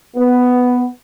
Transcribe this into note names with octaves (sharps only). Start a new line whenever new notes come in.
B3